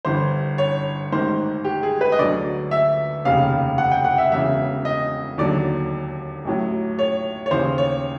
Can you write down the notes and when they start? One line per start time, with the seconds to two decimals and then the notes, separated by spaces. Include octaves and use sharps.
0.05 G1 G2 E3 C5
0.58 C#5
1.12 A1 G#2 D#3 C5
1.65 G4
1.83 G#4
2.01 B4
2.12 D#5
2.19 D2 D3 F#3 D5
2.71 E5
3.25 F1 D#2 C#3 F5
3.78 F#5
3.91 G5
4.05 F#5
4.18 E5
4.32 E1 E2 C#3 E3 E5
4.85 D#5
5.38 D#2 D3 F#3 D5
6.45 A1 A2 F#3
6.99 C#5
7.46 C#5
7.51 D#2 C#3 E3 C5
7.78 C#5